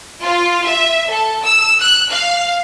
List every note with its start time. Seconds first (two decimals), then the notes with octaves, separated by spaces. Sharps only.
0.23 F4
0.65 E5
1.10 A4
1.43 E6
1.81 F#6
2.11 F5